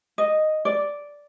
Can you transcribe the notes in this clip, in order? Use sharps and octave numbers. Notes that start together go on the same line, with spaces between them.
D#5
D5